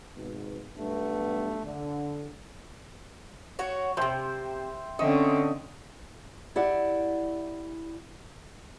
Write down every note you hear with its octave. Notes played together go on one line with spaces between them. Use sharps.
G#1 G#2 B2
B1 G2 A3 B3
D3
F#4 C#5
A2 C3 C5 E5 G5
D3 A3 C4 C#4 D#5
E4 G4 D5 F#5